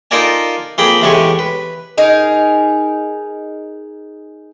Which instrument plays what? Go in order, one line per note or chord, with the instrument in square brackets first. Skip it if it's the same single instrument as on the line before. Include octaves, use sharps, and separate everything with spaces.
[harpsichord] D#4 F4 A4 A#4 D5 G#5
F2 A#3 G#4 G5 B5
E2 A2 G#3 G4 G#5 C#6
B4
[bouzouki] D#4 G#4 A#4